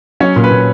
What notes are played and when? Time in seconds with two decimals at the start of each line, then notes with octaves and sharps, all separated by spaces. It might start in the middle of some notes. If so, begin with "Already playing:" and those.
0.20 F#3 C#4 C#5
0.36 A#2
0.44 B4
0.51 A#2